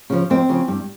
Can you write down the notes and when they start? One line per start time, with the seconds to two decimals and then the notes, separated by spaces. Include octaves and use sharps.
0.10 C#3 F3
0.30 F2 C4
0.49 C#3 F3
0.68 G2